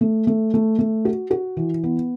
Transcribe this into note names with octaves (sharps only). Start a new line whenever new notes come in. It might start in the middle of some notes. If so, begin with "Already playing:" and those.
A3
A3
A3
A3
F#4
F#4
E3
B3